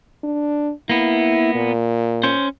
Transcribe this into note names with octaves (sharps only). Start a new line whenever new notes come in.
D4
A#3 B3 E4
A#2
C#4 C5